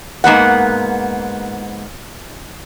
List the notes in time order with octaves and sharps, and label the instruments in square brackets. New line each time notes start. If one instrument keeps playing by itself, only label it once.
[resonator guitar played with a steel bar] G#2 A#3 B3 F#5